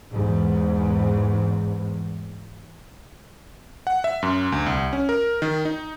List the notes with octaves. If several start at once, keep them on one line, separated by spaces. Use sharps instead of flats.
E2 G#2
F#5
E5
F#2
D2
C2
C#4
A#4
D#3
D#4